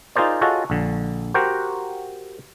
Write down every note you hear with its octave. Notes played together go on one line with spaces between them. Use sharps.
D#4 F4 G#4 A#4 C5 D5
F4 F#4 G#4 A4 C#5 D#5
A#1 D3
F#4 G4 A#4 C5 F#5 G5